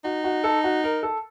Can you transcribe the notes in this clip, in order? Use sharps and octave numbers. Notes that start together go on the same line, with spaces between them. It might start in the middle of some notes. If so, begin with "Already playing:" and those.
D#4 F#4
F#4
A4
F#4
A#4
A4